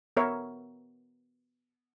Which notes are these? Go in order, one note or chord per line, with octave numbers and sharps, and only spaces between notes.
B3 A#4 C#5 E5